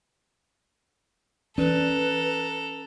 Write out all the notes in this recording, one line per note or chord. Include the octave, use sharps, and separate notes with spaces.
E3 C#4 A4 B4 A#5